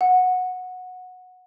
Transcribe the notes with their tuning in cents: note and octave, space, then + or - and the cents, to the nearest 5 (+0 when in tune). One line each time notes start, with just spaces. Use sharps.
F#5 -15